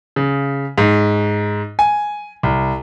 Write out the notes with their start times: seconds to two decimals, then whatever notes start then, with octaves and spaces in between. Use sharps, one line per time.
0.16 C#3
0.78 G#2
1.79 G#5
2.43 C2